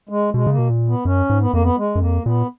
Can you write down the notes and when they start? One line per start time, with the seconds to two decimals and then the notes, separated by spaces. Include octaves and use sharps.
0.09 G#3
0.34 B2 G#3
0.47 C#3
0.52 A#3
0.59 B2
0.70 A#2
0.88 B3
1.05 F#2 C#4
1.30 G#2
1.41 B3
1.52 F2 A#3
1.63 B3
1.78 G#3
1.95 F#2
2.01 F2 A#3
2.26 A#2 B3